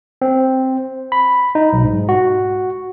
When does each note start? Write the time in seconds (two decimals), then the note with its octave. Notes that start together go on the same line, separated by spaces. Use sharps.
0.22 C4
1.12 B5
1.55 D#4
1.73 B1
1.84 G#2
2.09 F#4